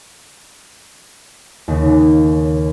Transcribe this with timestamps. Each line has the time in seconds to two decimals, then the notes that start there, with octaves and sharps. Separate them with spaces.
1.68 D#2 C#3